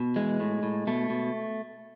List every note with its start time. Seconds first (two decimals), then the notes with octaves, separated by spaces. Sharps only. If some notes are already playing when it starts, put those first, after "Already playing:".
Already playing: B2
0.16 E3 G#3
0.40 A2
0.63 A2
0.87 B2 A3
1.10 B2